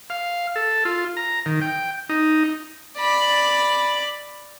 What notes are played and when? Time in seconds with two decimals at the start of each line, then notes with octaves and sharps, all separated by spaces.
0.10 F5
0.56 A4
0.85 F4
1.17 A#5
1.46 D#3
1.62 G5
2.09 D#4
2.98 D5 B5